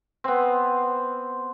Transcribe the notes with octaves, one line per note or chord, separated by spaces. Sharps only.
B3 C4